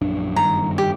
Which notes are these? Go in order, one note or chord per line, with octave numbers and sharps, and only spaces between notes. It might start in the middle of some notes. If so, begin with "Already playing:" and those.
A#1 F#2 D4
F#1 G2 D#3 A#5
G4